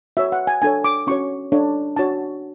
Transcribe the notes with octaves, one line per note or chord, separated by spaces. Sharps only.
F#4 C#5 E5
F#5
G#5
D4 A4 C#5 G#5
D6
C#4 F#4 C#5 C#6
D4 A4 C#5
D4 F#4 C#5 A5